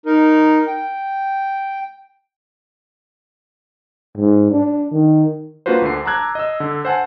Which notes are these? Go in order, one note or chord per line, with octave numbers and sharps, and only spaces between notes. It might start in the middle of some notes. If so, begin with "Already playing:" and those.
D#4 A#4
G5
G#2
D4
D#3
A#3 D4 F4 F#4 B4 C5
D2 D3 C7
A5 A#5 D6 E6 F#6 G#6
D#5 E6
D3
C5 F#5 G#5 A5